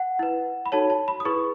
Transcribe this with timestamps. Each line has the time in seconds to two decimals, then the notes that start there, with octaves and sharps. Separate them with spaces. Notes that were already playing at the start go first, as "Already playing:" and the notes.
Already playing: F#5
0.19 E4 B4
0.66 B5
0.72 D#4 F#4 A4 C#5 A5
0.90 A5
1.08 B5
1.20 D#6
1.25 E4 G#4 B4 C#6